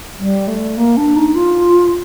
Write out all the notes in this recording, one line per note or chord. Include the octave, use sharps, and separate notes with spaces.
G3
A3
A#3
D4
D#4
F4